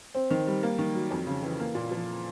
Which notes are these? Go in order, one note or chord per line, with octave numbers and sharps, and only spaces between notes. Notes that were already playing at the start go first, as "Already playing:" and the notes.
C4
D#3
G3
A#3
D#3
F#3
F2
C#3
E3
A#3
A#2
F3